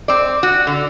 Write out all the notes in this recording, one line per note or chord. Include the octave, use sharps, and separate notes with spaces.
C4 D5
F#4
D3